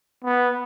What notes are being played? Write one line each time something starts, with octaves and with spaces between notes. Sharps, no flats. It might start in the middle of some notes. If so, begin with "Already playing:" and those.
B3